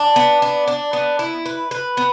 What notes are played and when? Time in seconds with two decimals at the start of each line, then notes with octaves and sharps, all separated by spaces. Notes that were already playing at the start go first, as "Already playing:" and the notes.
Already playing: D4
0.16 B3
0.42 D4
0.68 D4
0.93 B3
1.19 E4
1.46 B4
1.71 B4
1.97 B3